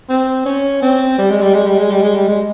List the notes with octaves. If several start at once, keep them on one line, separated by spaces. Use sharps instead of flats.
C4
C#4
C4
G3
G#3
G3
G#3
G3
G#3
G3
G#3
G3
G#3